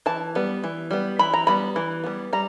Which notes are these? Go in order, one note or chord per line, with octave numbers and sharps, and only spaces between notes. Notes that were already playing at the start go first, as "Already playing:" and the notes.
E3 A5
G3 B3
E3
G3 B3
E3 B5
A#5
G3 B3 B5
E3
G3 B3
G3 A#5